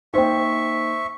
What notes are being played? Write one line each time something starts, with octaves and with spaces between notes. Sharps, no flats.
A#3 D#4 C5 E5 G5 C#6